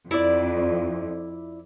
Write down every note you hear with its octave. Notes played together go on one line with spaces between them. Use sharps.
F2 E4 D5